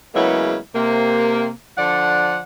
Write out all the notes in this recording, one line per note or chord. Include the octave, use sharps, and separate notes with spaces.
C#3 F#3 G#3 A#3 B3 E4
C3 A#3
D3 F3 D5 F#5